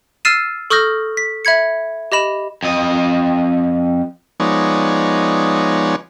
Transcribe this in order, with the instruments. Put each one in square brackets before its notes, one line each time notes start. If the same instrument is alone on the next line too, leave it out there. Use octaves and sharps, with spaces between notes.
[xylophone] E6 F6 A6 C7 D#7 E7
A4 C#6 D#6 F6 G6 A#6
B6
E5 B5 G#6 C#7
G4 D#5 B5 E7
[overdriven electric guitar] F2 D#5
[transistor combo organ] F3 G#3 B3 D#4 C#5 D5